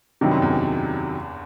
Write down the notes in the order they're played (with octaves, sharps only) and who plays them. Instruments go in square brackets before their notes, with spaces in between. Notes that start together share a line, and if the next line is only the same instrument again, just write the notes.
[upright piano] G2 [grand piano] C3 D#3 F#3
[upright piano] F#2
E2